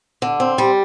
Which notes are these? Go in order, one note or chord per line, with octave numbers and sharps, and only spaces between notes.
D3
C4
G3